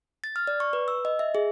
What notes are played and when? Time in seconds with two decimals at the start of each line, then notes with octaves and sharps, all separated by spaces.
0.24 A6
0.36 F6
0.47 D5
0.60 C#6
0.73 B4
0.88 E6
1.05 D#5
1.19 E5
1.35 G#4